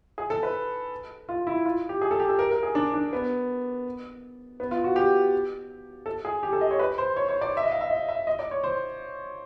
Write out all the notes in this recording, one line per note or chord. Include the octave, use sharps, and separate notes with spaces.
G#4
A4
B4
F4
E4
F4
G4
G#4
A4
G4
A4
A#4
A#4
G#4
D4
D4
B3
B3
F4
F#4
G4
A4
G#4
G4
A4
D#5
C#5
B4
C5
C#5
C#5
D5
E5
D#5
F5
E5
D#5
E5
D#5
D5
C#5
C5